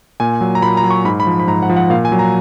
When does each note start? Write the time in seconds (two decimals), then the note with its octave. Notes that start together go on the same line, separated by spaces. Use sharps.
0.20 A#2 G#5
0.41 F#3
0.55 A#5
0.62 A#2 B5
0.77 A#5
0.84 F#3
0.90 C#6
1.05 G#2 B5
1.20 B5
1.27 F3
1.40 B5
1.47 G#2 A#5
1.63 F#5
1.70 F3
1.76 F#5
1.90 A#2 F5
2.05 G#5
2.12 F#3
2.19 A#5